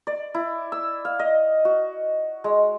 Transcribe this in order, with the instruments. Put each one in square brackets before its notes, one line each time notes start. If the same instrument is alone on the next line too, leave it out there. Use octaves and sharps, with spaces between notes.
[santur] D5
E4
E6
F5
D#5
F#4
G#3